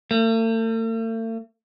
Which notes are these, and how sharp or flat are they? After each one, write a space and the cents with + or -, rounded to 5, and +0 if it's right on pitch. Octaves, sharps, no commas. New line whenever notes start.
A3 +45